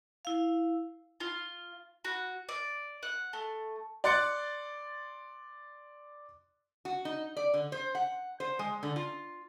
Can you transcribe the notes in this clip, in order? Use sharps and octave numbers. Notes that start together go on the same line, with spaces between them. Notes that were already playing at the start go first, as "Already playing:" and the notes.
E4 F5
F4
F#4
D5
F#5
A3
D5 C6 F#6 A6 C#7
F#4
D#4
D5
D3
C5
F#5
C5
G#3
D3
F4